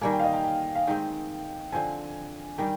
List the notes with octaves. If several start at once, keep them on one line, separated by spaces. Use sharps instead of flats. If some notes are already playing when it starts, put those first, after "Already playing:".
D#3 G3 A#3 G#5
G5
F5
D#5
G5
G5
F5
D#3 G#3 C4 G5
D3 F3 C4 G#5
D#3 G3 G5